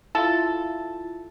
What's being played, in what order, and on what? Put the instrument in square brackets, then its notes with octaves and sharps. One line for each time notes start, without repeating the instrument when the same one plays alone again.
[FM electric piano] E4 F4 [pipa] A4